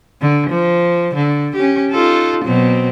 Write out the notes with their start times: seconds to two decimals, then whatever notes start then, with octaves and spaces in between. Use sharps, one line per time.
0.21 D3
0.50 F3
1.15 D3
1.55 C#4 G4
1.92 D#4 F4 A4
2.44 B2 F#3 C4